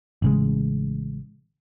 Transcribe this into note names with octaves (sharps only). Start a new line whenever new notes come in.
A1 C#3 G#3